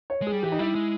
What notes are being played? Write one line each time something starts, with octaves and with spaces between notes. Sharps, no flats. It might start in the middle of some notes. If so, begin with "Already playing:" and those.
C#5
G#3 G#4
G3
E3 G4
D#4
G3 E4
G#3